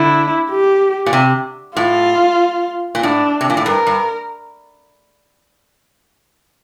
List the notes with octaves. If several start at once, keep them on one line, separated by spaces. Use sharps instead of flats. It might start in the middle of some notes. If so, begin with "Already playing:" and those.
Already playing: D3 E4
G4
A#2
C3
A2 F4
A#2
A2 D4
C3
A#2
A2
G2 A#4
G2